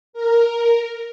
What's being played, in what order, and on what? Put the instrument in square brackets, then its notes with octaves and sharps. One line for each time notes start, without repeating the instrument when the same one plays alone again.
[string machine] A#4